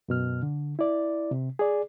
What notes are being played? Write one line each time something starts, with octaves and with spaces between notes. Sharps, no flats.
F#2 B2 F6
D3
E4 D5
C3
G#4 D5